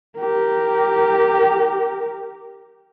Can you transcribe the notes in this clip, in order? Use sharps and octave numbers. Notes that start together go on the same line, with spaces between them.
G4 A#4